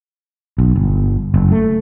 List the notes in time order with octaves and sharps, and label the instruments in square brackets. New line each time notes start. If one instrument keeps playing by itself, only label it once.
[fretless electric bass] B1
G1
F#1
A3